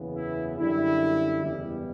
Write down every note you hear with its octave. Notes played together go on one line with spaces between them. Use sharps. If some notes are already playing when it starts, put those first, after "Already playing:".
Already playing: F#1 E2 C#3 E3 B3
E4
F#2 D3 G3 E4
F#1 E2 B2 G3